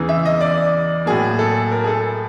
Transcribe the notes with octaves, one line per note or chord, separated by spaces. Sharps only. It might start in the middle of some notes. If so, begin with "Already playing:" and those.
Already playing: E2 C#3 E3
E5
D#5
D5
A2 F#3 A#3 G#4
A4
A#4
G#4
A4